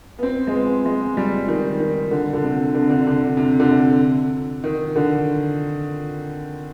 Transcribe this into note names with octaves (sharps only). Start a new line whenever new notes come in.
B3
C4
G#3
B3
G#3
G3
D#3
D#3
D3
D3
C3
D3
C3
D3
D3
C3
D3
C3
D#3
D3